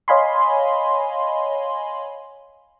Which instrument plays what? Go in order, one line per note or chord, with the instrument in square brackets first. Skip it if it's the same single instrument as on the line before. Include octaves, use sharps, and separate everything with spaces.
[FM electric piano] C#5 D#5 F5 G#5 B5 C6